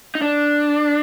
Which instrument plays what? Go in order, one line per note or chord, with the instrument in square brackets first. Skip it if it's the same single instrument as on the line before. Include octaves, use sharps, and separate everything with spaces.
[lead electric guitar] D#4
D4